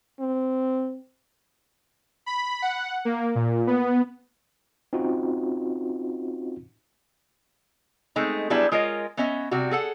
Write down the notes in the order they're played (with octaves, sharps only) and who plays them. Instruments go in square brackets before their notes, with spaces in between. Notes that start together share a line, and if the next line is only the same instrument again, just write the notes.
[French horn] C4
[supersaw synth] B5
F#5
A#3
A#2
B3
[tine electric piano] C4 C#4 D#4 F4 F#4
[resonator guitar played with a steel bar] G#3 A3 C4 D#4
F#3 G3 B3 D4 E4 G#4
G#3 F4 A#4 C#5 D#5
B3 C#4 D#5 E5
C3 G3 F#4
G#4 A4 F#5